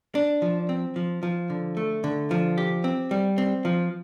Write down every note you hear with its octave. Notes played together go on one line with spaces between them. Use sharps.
D4
F3
C4
F3
F3
D3
A3
D3
F3
G4
C4
G3
C4
F3